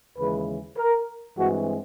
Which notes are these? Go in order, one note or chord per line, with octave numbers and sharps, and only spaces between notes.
D#2 C#3 E3 G#3 B4
A#4
G2 E3 G#3 C4 F#4